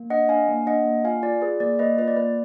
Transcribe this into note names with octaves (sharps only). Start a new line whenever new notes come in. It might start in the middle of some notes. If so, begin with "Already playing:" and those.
Already playing: A#3
D4 D#5 F#5
D4 F5 G#5
A#3
D4 D#5 F#5
A#3
F4 F5 G#5
F4 D5
G#4 B4
A#3 D5
A#3 B4 D#5
F4 B4
D5
A#3 B4